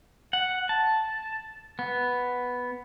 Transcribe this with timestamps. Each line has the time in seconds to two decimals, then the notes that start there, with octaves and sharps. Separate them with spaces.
0.33 F#5
0.69 A5
1.79 B3